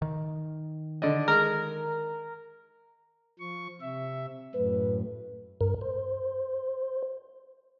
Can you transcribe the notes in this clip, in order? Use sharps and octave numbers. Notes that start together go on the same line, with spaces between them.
D#3
D3 D5 D#5
G#3 A#4
F3 C#6
C3 E5
F#2 A2 B4
G2 A#4
C5